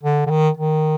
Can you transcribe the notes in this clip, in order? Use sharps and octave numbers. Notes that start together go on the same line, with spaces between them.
D3
D3
D#3
D#3